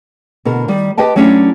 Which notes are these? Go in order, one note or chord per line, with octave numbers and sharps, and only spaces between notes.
B2 D3 A#4
D#3 G3
G4 B4 D#5 G5 A5
F#3 A3 C#4 D4 E4 G4